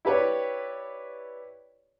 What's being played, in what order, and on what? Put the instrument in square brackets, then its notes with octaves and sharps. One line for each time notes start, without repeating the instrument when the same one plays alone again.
[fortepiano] E4 G4 B4 C#5 D5